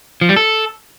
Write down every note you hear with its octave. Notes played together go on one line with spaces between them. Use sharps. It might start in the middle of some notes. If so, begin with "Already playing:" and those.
F3
G3
A4